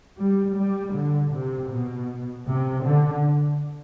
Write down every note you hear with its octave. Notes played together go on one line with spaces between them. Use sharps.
G3
G3
D3
C3
B2
C3
D3